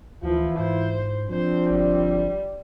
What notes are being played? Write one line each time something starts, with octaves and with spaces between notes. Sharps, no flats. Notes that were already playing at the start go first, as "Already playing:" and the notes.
D2 E3 F3 E4 F4
G#2 C5
F3 C4 D4 C5
G1 G3